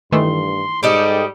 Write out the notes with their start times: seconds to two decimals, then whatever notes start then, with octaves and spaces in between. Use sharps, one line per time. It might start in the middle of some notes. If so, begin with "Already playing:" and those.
0.12 G2 D#3 E3 A3 C6
0.83 G#2 G3 G4 A4 D#5